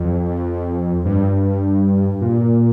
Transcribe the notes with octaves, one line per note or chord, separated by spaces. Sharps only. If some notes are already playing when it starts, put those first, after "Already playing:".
Already playing: F2
G2
A#2